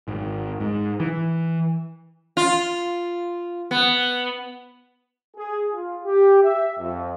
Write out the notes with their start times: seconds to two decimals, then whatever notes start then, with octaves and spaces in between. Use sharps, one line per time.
0.08 G#1
0.60 G#2
1.00 E3
2.37 F4
3.71 B3
5.37 G#4
5.72 F4
6.04 G4
6.43 E5
6.78 F2